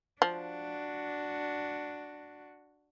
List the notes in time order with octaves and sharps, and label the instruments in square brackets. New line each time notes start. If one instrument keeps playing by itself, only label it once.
[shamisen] F3 [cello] D4 F#4